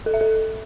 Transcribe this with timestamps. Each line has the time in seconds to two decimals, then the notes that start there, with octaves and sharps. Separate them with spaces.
0.06 A4
0.14 E5
0.21 A4